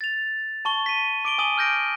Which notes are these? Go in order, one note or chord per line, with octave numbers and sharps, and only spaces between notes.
A6 F7
A5 C#6 G7
B6 D#7
D6 D7 G7
G#5 D#6 D#7 F#7 G7
F6 G6 A#6 D7